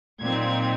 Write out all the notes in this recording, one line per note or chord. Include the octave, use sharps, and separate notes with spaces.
A#2 F#3 C4 D#4 G#6